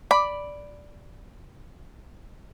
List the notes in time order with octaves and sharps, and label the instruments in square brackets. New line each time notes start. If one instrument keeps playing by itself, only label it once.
[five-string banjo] D5 B5